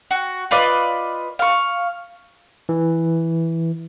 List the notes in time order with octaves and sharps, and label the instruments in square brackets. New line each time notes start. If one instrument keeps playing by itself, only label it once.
[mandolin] F#4
F4 B4 D5 D#5
F5 C#6
[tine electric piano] E3